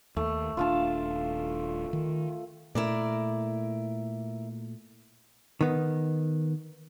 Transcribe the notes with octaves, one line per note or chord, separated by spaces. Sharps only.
D#2 A3
D#1 D4 F4 F5 A5
D#3
A#2 A3 E4 A#4 D5
D#3 B3